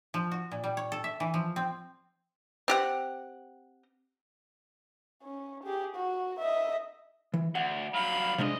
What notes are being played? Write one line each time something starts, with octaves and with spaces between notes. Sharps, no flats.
F3
F#4
A#2
G3
C#5
A4
E5
E3
F3
C4
C4 G4 F#5
C#4
G4 G#4
F#4
D#5 E5
E3
D2 F#5
G2 F#3 F5 B5
D2 C3 G#3 D4 D#5